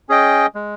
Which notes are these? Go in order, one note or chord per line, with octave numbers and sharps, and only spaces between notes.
C#4 G#4 D#5 G5
G#3